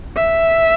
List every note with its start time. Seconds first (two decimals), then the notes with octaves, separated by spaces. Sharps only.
0.16 E5